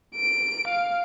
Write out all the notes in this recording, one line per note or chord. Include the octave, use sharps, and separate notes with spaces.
D7
F5